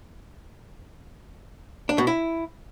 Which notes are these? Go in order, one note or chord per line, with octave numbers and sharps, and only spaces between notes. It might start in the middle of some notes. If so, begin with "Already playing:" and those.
D4
B2
E4